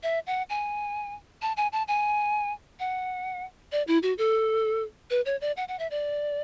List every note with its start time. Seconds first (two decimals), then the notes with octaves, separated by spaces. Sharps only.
0.03 E5
0.27 F#5
0.49 G#5
1.42 A5
1.57 G#5
1.72 A5
1.88 G#5
2.79 F#5
3.72 D5
3.87 E4
4.03 F#4
4.18 A4
5.10 B4
5.25 C#5
5.41 D5
5.57 F#5
5.68 F#5
5.79 E5
5.91 D5